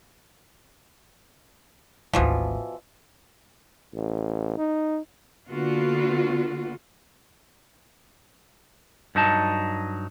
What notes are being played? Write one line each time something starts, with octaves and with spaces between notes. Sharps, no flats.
G#1 D2 B2 E3 F3
A1
D#4
D3 A#3 B3 F4 F#4
G2 F#3 D#4 A5